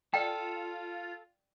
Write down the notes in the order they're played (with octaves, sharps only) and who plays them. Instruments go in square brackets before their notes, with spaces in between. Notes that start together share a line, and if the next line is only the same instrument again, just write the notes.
[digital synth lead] F4 [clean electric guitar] A4 [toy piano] D5 G5